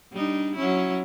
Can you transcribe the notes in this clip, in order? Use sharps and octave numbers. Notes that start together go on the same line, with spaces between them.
G3 D4 D#4
F#3 C#4 E4